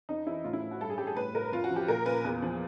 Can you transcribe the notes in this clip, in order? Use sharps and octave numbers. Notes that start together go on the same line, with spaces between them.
F2 D#4
E3 E4
A2 F4
E4
A2
F#4
G2 A4
G#4
G2 G4
G#4
A2 B4
A2 A#4
F2 F4
F#4
F3
G4
A#2 A#4
A#2 B4
E2
F3